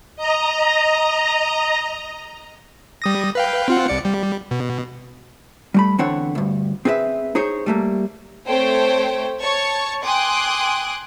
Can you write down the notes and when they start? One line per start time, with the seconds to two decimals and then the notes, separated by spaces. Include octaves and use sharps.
0.16 D#5 A#5
3.02 G3 D#6 A#6
3.35 B4 F5 G5
3.68 C4 F4 F#5
3.88 C2 D5 C#7
4.05 G3
4.51 B2
5.74 G3 A3 B5
5.98 E2 D3 C4 C#5 F#5
6.35 D2 G2
6.85 C4 G#4 B4 D#5 E5
7.35 D#4 G#4 C5 C#5
7.66 G3 A3 A#3
8.48 A3 C4 C5 C#5 G5
9.40 C#5 A5 C#6
10.04 G5 G#5 C6 D6 D#6 F#6